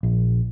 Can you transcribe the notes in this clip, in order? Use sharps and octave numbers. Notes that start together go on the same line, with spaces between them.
A#1